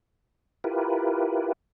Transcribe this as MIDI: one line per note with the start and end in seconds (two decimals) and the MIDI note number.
0.64 1.53 64
0.64 1.53 65
0.64 1.53 67
0.64 1.53 70
0.64 1.53 71